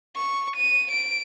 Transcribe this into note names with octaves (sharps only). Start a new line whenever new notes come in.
C#6
D#7
D7